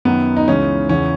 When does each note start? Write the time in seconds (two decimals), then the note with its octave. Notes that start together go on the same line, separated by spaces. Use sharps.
0.05 F#2 D#3 F#3 B3
0.36 D#4
0.48 C#2 C#3 E3 C#4
0.89 E2 C#3 E3 C#4